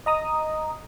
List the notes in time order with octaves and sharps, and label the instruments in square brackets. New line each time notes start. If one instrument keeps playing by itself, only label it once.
[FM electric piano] D#5 A#5 D#6